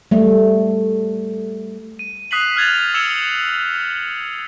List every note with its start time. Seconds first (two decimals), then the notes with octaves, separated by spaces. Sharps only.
0.11 G3 A3
1.99 D#7
2.31 D#6 F#6 B6 C7 D#7 F#7
2.56 F6 F#6 G#6 A6 F7
2.94 E6 G#6 C#7 E7 G7